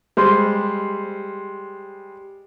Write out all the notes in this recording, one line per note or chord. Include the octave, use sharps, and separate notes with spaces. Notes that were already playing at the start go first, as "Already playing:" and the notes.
G3 G#3 C5 C6